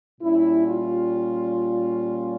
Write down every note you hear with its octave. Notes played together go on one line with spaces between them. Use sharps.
A#2 G3 C#4 E4
F4